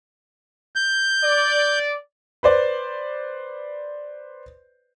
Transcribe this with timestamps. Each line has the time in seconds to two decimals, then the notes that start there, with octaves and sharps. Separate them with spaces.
0.76 G6
1.24 D5
2.43 B4 C5 D5